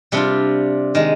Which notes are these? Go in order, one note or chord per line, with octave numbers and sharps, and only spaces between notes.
C3 G3 D4 F4
D#3 G#3